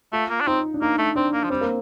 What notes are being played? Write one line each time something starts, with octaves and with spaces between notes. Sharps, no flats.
A3 F4
A#3
D4
C4 D#4
D4
A#3 D#4
A3
C4 D4
A#3
F3
G3 C4
A#3